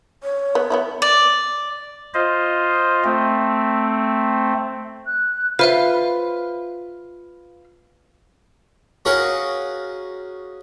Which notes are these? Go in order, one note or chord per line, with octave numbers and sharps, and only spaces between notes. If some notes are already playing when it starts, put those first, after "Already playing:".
C#5
B3
B3 C#4 E4
D5
F4 C5 D#5
A3 C4
F#6
F4 B4 C5 E5 F5
C#4 F#4 G#4 A#4 F5 F#5